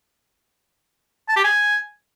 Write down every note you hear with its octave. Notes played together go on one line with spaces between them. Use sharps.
A5
G4
G#5